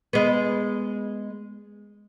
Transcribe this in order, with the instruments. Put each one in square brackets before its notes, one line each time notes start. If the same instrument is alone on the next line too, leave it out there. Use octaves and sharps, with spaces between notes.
[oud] G#3 B3